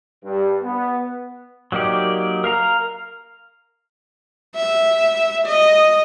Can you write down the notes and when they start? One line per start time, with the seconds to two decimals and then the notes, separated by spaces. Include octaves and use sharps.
0.24 G2
0.62 B3
1.72 F#3 A#3 D#4 G4 D5
2.44 A#4 F5 A#5
4.56 E5
5.47 D#5